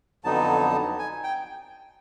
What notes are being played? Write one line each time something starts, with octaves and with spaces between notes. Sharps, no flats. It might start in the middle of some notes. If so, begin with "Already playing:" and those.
F2 D3 F#3 B3 D#4 A5
G#5
G5